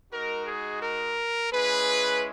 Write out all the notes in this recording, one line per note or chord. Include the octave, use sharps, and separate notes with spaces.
G#3 D#4 F#4 A#4
G#4
A#4
G#3 C#4 E4 G#4 B4